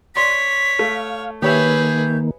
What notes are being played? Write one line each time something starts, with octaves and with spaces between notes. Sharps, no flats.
C#5 D5 C6 B6
A3 F5
D#3 A#3 G4 G#4 B4 C#5 E5 G6